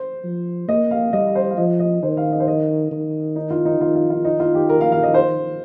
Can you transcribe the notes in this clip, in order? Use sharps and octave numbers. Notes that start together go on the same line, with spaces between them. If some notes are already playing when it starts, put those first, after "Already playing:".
Already playing: C5
F3
A#3 D#5
F5
G3 D#5
C5
F5
F3 D#5
D#5
D#3 C5
F5
D#5
C5
D#5
D#3
D#4
F4
D#4
D#3 F4
F4
F4
D#4
F4
G4
A#4
F5
F5
D#5
C5